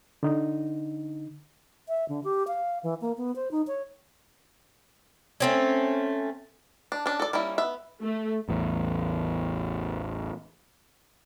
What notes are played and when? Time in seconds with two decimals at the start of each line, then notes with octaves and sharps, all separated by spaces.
0.23 D3 D#4
1.88 E5
2.09 D3
2.24 G4
2.47 F5
2.83 E3
3.01 A#3
3.17 B3
3.35 C5
3.51 D#4
3.67 C#5
5.40 A3 C4 C#4
6.92 D4
7.06 C#4 D4
7.20 A4 D5
7.33 G3 A#3 C#4 E4
7.58 B3 E5
8.02 A3
8.49 A1 E2